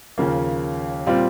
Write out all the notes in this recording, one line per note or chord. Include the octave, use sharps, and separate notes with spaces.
D#2 C#3 F3 A#3
A#2 G3 C4 F4